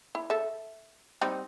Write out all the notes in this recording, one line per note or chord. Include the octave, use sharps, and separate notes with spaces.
E4
A4 E5
G3 C4 D#4